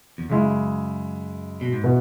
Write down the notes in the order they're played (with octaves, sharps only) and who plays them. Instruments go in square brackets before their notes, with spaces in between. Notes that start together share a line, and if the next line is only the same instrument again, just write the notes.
[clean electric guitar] E2
[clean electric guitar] F#2 [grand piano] C#3 G#3 E4
[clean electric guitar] B2
G#2
[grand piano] B2 B3 E4